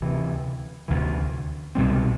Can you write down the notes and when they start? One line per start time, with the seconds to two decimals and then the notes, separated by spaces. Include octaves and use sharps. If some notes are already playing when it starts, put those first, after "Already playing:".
0.01 D2 C3 E3
0.88 D2 C3 E3
1.75 C2 B2 G3 C4